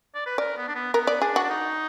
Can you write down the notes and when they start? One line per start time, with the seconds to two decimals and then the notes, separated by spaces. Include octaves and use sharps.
0.15 D5
0.26 B4
0.38 A#4 D5
0.57 B3
0.68 D4
0.75 B3
0.93 B3 A#4
1.07 D5
1.21 D4 G#4
1.36 F#4
1.43 D4
1.50 D#4